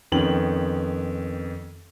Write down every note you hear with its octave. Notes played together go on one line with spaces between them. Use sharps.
F2 D#3 B3 C#4 G5 F#7